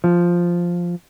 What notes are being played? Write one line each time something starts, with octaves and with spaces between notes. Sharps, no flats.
F3